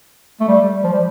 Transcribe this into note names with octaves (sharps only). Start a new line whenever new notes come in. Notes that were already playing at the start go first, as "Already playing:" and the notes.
A3
G3
F3
G3